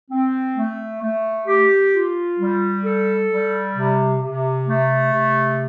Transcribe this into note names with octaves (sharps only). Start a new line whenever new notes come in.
C4
A3
A3
G4
F4
G3
A4
G3
C3
C3
A3
C3